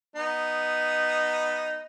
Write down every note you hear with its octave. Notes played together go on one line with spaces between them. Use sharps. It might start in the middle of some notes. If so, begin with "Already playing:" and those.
B3 D#4